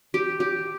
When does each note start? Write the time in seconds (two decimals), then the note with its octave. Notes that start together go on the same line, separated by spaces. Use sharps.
0.14 G4
0.40 G4